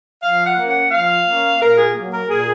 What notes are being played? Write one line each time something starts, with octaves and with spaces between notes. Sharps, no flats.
F3 F5
F#5
A#3 C#4
F#5
F3 F5
A#3 C#4
A#2 A#4
G#4
F#3 A#3
A#4
A#2 G#4